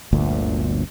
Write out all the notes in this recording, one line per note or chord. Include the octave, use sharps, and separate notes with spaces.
G1 D2 A#2